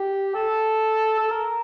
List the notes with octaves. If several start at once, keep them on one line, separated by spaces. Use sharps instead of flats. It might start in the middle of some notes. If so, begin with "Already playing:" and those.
Already playing: G4
A4
A4
A#4